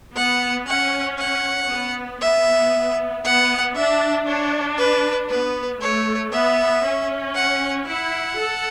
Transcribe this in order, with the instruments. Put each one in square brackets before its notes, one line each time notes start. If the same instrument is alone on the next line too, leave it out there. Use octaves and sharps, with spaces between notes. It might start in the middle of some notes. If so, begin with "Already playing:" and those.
[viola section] B3 [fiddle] F#5
[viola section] C#4 [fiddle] F#5
[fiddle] F#5
[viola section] B3
[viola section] B3 [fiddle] E5
[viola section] B3 [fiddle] F#5
[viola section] D4 [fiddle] E5
[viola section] D4 [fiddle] C#5
[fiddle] B4
[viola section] B3 [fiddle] B4
[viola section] A3 [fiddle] C#5
[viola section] B3 [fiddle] E5
[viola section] C#4
[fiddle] F#5
[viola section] E4 [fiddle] F#5
[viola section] A4